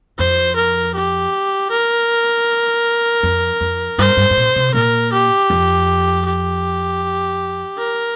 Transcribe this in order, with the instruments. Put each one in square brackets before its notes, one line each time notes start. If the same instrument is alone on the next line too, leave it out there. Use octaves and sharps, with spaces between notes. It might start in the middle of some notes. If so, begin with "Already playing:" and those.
[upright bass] F2 [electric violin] C5
[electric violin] A#4
G4
A#4
[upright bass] F2
F2
[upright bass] G2 [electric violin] C5
[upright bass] G2
G2
A#2
C3
[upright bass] A#2 [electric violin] A#4
[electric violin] G4
[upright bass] F2
[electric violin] G4
A#4